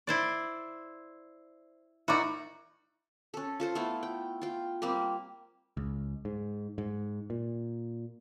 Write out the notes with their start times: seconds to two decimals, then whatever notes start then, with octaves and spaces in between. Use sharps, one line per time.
0.07 E4 C5 D5
2.08 D#4 E4 F#4 A#4 D5
3.34 C#4 A4
3.60 F4 A4 C5
3.75 A3 B3 E4 F4
4.03 G5
4.42 F4 G5
4.82 G3 A#3 C4 G4
5.77 C#2
6.25 G#2
6.78 G#2
7.30 A#2